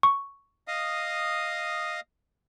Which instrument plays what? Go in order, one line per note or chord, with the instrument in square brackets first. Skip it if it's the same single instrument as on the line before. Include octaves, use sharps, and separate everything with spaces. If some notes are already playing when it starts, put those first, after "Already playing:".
[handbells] C#6
[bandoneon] D#5 F5 D#6